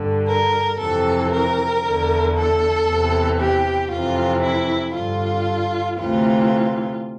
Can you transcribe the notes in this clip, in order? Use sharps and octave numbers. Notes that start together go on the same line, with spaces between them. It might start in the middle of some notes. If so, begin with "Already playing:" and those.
Already playing: G2 D3
A#4
F2 C3 E3 A4
A#4
E2 D3
A4
E2 C3 E3
G4
F2 C3 E3 F4
E4
G2 D3 F4
D2 C3 E3 F4